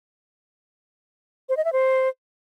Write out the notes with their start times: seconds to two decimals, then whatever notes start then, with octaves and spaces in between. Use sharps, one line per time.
1.49 C5
1.57 D#5
1.65 E5
1.73 C5